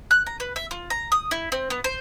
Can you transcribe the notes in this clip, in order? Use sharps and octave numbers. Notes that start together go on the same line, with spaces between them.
F#6
A#5
B4
E5
F4
A#5
D#6
E4
C4
B3
C5